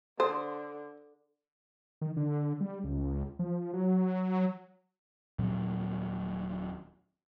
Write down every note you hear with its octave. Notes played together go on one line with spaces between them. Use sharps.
D3 A4 C5
D#3
D3
G3
C#2
F3
F#3
D#1 A#2 F#3 C4